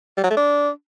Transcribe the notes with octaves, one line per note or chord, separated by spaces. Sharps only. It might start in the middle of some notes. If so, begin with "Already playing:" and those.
G3
F#3
A3
D4